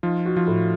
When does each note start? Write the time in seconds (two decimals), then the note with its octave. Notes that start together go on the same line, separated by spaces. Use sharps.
0.03 F3 D#4 F4
0.25 F#4
0.37 F3 F4
0.47 A2